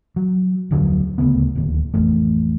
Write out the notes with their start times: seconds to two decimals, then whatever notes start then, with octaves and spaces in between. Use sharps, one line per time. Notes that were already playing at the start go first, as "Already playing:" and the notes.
0.16 F#3
0.71 D1 F2 D3 F#3
1.18 D#1 D2 C#3 B3
1.55 D1 D#2
1.94 A1 F2 A3